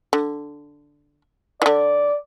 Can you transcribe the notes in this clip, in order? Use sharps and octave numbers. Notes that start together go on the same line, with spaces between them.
D3
D3 E3 D5